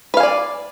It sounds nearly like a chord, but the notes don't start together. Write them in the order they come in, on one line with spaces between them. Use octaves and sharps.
B4 F5 G#5 D5